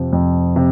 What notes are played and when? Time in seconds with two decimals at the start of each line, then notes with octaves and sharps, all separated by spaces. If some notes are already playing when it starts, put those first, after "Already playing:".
Already playing: F2 C3 F3
0.13 F2
0.56 C3